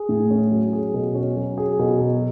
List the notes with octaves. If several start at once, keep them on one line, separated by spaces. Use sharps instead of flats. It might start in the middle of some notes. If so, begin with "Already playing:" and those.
Already playing: G#4
A2
C#4
F#3
G#4
B2
C#4
F#3
G#4
B2
F#3